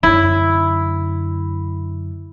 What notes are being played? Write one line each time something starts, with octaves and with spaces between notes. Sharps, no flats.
F#2 D3 E4